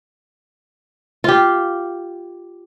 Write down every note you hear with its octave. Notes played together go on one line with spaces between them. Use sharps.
F4 G4